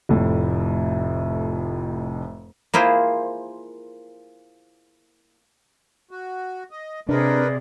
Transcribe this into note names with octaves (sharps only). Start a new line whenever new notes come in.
F1 F2 A2
A#3 E4 F4 G#4 C5
F#4
D#5
C3 D4 G#4 A#4 B4 D5 D#5